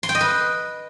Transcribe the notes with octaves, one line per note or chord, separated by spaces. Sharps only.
C6
G5
D#5
B4